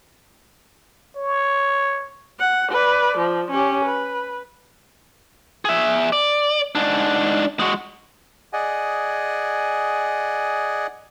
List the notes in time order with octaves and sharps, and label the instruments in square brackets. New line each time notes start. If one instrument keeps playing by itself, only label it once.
[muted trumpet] C#5
[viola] F#5
B4 D5
F3
C#4 G4
B4
[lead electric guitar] G#4 E5
D5
G#2 D4
G#3 F#4
[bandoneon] G#4 D5 D#5 F#5 G#5